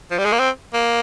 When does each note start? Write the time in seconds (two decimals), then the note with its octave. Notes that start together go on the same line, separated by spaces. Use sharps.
0.11 F3
0.18 G3
0.25 G#3
0.32 A#3
0.39 C4
0.74 A#3